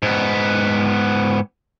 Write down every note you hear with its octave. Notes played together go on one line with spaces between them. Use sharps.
G#2 B3